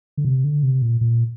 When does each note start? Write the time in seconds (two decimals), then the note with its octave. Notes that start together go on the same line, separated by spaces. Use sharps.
0.17 D3
0.25 C3
0.44 D3
0.63 C3
0.82 A#2
1.01 A#2